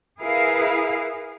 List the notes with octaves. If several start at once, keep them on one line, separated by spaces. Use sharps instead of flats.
E4 G#4 A#4 B4 F5